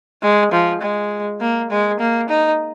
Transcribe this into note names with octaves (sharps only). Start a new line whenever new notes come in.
G#3
F3
G#3
A#3
G#3
A#3
D#4